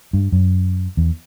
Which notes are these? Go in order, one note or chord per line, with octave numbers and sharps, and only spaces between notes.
G2
F#2
E2